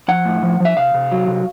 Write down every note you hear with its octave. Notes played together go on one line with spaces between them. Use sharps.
F3 F#5
A2
F3
F3 E5
C3 F5
C3
F#3
C3